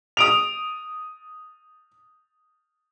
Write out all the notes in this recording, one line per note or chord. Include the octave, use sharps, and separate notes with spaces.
D#6 D7 F7